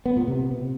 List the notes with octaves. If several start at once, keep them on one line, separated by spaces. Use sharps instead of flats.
B3
A#2
C3